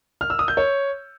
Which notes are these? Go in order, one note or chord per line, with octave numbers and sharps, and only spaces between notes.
F6
E6
D#6
G6
C#5